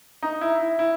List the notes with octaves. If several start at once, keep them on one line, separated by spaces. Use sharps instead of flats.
D#4
E4
E4
E4